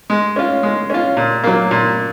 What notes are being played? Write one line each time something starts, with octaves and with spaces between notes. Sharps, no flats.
G#3
C#4 F4
G#3
C#4 F4
A#2
F#3 A#3
A#2